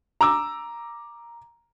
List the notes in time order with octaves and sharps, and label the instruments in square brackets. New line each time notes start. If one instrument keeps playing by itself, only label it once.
[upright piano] A#5 D6 E6